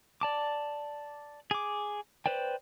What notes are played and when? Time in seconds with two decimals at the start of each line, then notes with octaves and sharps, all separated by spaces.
0.21 D5 A5 D6
1.51 G#4 D6
2.26 B4 C5 D5 G5